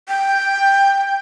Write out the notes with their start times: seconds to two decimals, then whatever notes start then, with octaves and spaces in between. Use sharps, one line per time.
0.08 G5